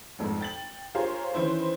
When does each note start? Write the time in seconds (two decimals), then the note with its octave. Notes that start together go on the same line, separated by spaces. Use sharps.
0.19 G#1 F2 G#2
0.40 G5 A6 F#7
0.95 F4 G4 G#4 A#4 C5 C#5
1.34 D#3 E3 C#4 E4 B4 C5